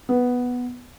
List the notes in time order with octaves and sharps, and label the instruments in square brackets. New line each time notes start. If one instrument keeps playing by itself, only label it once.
[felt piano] B3